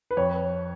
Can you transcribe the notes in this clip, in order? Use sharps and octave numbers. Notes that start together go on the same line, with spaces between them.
B4
F2 C#5